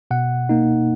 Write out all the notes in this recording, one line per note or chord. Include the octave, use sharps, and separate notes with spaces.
B2 F#5
A#3 D#4